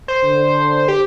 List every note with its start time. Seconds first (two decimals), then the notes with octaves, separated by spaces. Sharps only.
0.08 C5
0.23 D3
0.88 G4